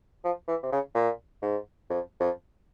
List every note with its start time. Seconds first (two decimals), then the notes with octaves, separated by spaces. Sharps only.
0.24 F3
0.48 E3
0.63 C3
0.72 C#3
0.95 A#2
1.42 G#2
1.90 F2
2.20 F2